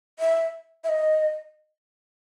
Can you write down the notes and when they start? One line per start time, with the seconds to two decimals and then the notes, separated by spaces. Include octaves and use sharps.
0.19 E5
0.84 E5
0.89 D#5